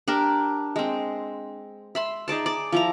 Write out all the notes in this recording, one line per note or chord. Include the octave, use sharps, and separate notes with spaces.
D4 G4 A#4
G#3 C4
E5 B5 C6
D#4 G#4 D5 A5
D5
F3 E4 A#5